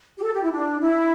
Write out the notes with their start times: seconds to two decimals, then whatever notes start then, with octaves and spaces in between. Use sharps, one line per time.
0.17 G4
0.23 A4
0.33 G4
0.43 E4
0.51 D4
0.81 E4